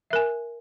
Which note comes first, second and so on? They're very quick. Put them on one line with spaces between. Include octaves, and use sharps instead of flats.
E5 A#4 G#5